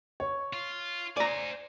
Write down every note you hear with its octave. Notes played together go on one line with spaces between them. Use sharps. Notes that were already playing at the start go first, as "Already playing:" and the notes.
C#5
F4
C5 D5 G#5 A#5